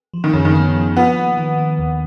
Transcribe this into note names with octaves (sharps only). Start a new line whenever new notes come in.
F3
D#3
F#2 C#3
D#3
B3
F3
B3 F4
A#3
D#3
D#3
D#2